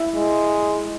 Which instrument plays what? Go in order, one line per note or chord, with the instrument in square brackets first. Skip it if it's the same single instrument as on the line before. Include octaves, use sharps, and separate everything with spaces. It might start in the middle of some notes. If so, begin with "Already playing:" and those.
Already playing: [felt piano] E4 E5
[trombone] G#3